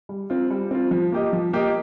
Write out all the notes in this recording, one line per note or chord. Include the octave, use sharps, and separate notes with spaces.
G3
C4 F4
G3
C4 F4
F3
A#3 G4 D#5
F3
A#3 G4 D#5